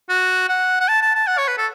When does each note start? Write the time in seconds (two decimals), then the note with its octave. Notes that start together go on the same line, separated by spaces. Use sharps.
0.09 F#4
0.49 F#5
0.80 F#5
0.88 A5
1.02 A5
1.15 A5
1.27 F#5
1.38 C#5
1.48 B4
1.58 A4